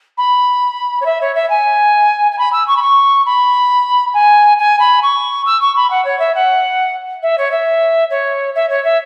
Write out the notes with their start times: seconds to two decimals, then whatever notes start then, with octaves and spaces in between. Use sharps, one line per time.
0.17 B5
1.00 C#5
1.05 E5
1.21 C#5
1.35 E5
1.49 G#5
2.31 G#5
2.38 B5
2.52 E6
2.67 C#6
2.76 B5
2.82 C#6
3.25 B5
4.13 G#5
4.58 G#5
4.79 B5
5.02 C#6
5.46 E6
5.61 C#6
5.76 B5
5.90 F#5
6.04 C#5
6.19 E5
6.34 F#5
7.22 E5
7.37 C#5
7.51 E5
8.10 C#5
8.55 E5
8.69 C#5
8.84 E5